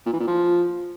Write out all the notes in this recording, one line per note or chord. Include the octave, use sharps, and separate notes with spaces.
A#2
E3
A#2
F3